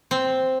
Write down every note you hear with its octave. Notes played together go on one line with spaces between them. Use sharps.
C4